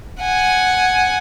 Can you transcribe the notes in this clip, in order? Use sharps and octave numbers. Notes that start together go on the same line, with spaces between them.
F#5 G#5